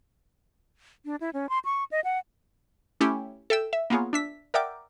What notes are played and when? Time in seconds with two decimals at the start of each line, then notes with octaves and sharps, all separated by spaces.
1.05 D4
1.21 E4
1.33 C#4
1.49 C6
1.65 C#6
1.91 D#5
2.04 F#5
3.01 A3 C#4 E4 G4
3.50 A4 E5 G5 E6
3.73 E5
3.90 A#3 B3 F4 G#4 C#5
4.13 D4 E5 B6
4.54 A#4 D5 E5 F#5 G5 D6